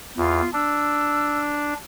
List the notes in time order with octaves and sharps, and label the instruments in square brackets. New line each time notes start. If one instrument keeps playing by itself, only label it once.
[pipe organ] E2 [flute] F4
[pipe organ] D4 [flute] E6